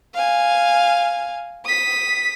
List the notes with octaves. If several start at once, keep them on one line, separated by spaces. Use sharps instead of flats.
F5 G#5
D#6 B6